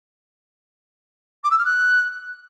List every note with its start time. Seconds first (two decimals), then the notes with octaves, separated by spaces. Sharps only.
1.43 D6
1.51 E6
1.58 F6
1.65 F#6